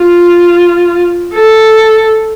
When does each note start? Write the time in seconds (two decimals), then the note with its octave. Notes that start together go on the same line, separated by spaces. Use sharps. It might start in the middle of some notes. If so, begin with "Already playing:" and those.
Already playing: F4
1.34 A4